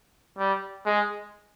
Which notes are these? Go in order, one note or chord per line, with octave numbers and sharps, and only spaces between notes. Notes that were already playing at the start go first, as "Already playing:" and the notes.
G3
G#3